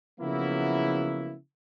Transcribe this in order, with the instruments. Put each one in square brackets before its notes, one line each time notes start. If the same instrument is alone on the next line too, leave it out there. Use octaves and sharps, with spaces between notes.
[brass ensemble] C#3 F3 F#3 A#3 B3 E4